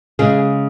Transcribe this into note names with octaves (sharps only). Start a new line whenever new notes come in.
C#3 G#3 G#4